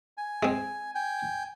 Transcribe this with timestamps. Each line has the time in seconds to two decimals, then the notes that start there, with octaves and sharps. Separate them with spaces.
0.17 G#5
0.43 G#3 C4
0.95 G5 G#5